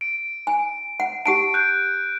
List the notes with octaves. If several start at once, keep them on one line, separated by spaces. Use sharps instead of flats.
D7
G#5
F#5
G4 F#5 A5 D7
F#6 G6 D7